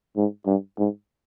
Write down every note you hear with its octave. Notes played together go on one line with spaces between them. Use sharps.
G#2
G2
G#2